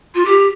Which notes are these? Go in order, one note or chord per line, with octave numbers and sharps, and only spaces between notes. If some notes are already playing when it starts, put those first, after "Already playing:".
F4
G4